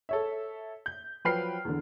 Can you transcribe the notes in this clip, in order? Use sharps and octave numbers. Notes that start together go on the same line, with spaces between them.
A4 C#5 E5
G6
F3 F#3 B4 G5 F6 C7
E2 D3